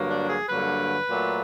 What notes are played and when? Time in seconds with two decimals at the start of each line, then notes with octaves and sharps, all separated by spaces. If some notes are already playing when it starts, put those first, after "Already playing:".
Already playing: G2 D3 F#3 A#3
0.09 D4
0.29 G#4
0.48 G2 D3 F#3 A#3 B4
1.08 A#2 F#3 A3